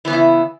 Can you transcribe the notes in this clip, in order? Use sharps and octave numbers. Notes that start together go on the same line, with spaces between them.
C#3 E3 B3 E4